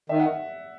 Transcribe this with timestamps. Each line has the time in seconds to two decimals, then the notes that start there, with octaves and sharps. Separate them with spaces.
0.09 D#3 E5
0.20 F#5